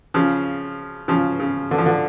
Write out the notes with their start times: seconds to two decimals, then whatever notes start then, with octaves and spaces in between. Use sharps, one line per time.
0.14 C#3 F3
1.08 C#3 F3
1.40 C#3
1.71 D3
1.78 F3
1.86 D3